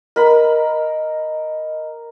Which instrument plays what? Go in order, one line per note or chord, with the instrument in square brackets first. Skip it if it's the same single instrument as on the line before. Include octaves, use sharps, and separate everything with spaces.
[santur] A#4 B5 [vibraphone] D#5